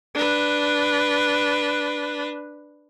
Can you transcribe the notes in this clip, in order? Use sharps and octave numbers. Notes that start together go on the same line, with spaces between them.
D4 B4